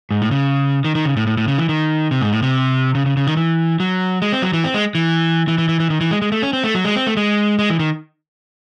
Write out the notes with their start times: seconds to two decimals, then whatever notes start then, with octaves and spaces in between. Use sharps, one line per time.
0.11 G#2
0.22 A2
0.31 C#3
0.85 D#3
0.95 D#3
1.05 C#3
1.17 A2
1.27 A2
1.37 A2
1.48 C#3
1.58 E3
1.69 D#3
2.11 C3
2.21 G#2
2.32 A2
2.43 C3
2.95 C#3
3.06 C#3
3.17 C#3
3.27 D#3
3.37 E3
3.80 F#3
4.22 G#3
4.33 C4
4.42 F#3
4.53 E3
4.64 C4
4.74 G#3
4.95 E3
5.48 E3
5.58 E3
5.69 E3
5.80 E3
5.90 D#3
6.01 E3
6.11 G#3
6.22 G#3
6.32 A3
6.42 C#4
6.53 C4
6.64 A3
6.75 F#3
6.85 G#3
6.96 C4
7.07 A3
7.17 G#3
7.59 G#3
7.70 E3
7.79 D#3